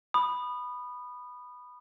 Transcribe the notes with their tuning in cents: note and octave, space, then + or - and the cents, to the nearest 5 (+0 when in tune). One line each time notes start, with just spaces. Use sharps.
B5 +0 D#6 -25